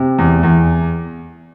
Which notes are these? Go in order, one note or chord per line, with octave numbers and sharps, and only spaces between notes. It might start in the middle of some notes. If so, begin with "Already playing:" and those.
Already playing: C3
E2
E2